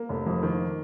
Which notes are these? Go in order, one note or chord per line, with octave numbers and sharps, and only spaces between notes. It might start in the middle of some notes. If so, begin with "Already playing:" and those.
Already playing: A#3
F1
F2
D#3